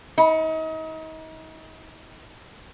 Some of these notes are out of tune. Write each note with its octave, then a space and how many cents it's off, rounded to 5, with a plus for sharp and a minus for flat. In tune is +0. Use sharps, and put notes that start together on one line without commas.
D#4 +35